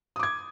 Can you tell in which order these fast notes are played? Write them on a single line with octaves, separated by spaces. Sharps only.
D#6 D6 G#6